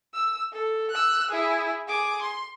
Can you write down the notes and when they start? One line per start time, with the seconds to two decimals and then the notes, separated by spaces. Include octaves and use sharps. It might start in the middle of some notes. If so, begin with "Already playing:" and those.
0.14 E6
0.52 A4
0.90 E6 F#6
1.30 E4 G#4
1.87 G#4 D6
2.21 C6